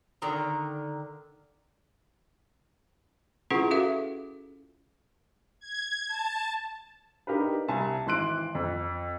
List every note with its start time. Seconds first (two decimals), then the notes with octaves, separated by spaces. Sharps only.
0.22 D3 D#3 A#5
3.50 C#4 E4 F4 G#4 B4 F#5
3.71 F#4 A4 E5 F5
5.60 G#6
6.08 A5
7.27 D4 D#4 G4 A#4 B4
7.68 C2 E5 G#5 A5
8.06 G#1 E3 C6 F#6 D7
8.55 F2